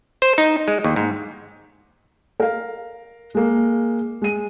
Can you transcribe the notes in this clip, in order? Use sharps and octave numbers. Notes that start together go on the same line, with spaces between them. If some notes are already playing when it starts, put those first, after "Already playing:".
C5
D#4
G#3
D#2
G#2
A#4 F5
G#3 A#3
G#3 D#7